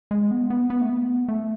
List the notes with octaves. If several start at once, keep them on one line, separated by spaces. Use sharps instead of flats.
G#3
B3
B3
B3
A3
B3
A3